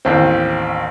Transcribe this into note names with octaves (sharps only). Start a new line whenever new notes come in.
A1 D#2 C4